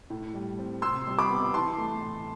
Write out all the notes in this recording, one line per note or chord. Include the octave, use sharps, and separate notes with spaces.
A2
G3
C4
C3 C6 E6
G3
B5 D6
B3
E3 A5 C6
A3
A2